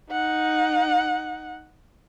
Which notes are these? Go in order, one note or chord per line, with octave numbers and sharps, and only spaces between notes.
D#4 F#5